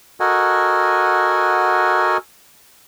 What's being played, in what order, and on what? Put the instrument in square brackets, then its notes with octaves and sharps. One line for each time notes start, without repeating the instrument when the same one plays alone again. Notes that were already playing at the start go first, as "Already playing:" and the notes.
[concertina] F#4 A4 A#4 D#5 F#5 G#5